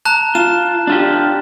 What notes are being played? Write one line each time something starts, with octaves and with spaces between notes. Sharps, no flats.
A5 A#5 F#6
F4 E7
D4 F4 G4